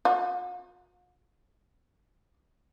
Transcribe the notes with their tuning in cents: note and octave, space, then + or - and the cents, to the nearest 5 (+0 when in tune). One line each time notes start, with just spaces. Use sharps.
F4 +45